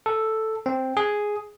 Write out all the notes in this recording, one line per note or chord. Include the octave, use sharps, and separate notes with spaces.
A4
C4
G#4